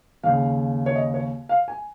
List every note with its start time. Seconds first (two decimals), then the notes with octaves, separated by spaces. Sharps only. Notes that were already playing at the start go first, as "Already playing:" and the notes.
0.23 D#2 C#3 F5
0.86 C#5
0.95 D#5
1.14 C#5
1.49 F5
1.68 G#5